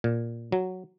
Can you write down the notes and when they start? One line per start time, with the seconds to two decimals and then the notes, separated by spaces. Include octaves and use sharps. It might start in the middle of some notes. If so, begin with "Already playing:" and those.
0.04 A#2
0.52 F#3